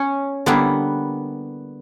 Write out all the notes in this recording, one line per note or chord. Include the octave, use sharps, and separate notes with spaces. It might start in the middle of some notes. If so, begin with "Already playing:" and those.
Already playing: C#4
D3 G3 A#3 B3 E4